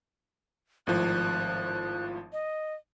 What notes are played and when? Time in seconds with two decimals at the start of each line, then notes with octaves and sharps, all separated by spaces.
0.87 G#1 A2 F3 F#6
2.33 D#5